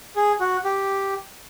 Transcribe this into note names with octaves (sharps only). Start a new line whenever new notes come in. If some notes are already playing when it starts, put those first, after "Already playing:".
G#4
F#4
G4